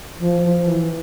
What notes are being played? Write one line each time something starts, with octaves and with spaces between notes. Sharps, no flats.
F3
F3
E3